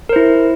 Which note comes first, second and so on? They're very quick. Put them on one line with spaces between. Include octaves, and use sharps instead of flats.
A#4 C5 E4